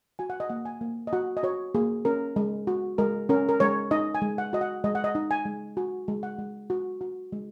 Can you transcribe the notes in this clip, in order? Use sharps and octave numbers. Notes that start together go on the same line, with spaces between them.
F#4 G#5
F#5
D#5
A#3 F#5
G#5
A#3
D#5
F#4 F#5
D#5
F#4 C#5
A#3 G#4
C#4 A#4
G#3
F#4
G#3 A#4
C#4 A#4
A#4
G#3 C#5
D#4 D#5
G#5
G#3
F#5
F#4 D#5
F#5
G#3 D#5
F#5
D#5
D#4
G#5
G#3
F#4 G#5
G#3
F#5
G#3
F#4
F#4
G#3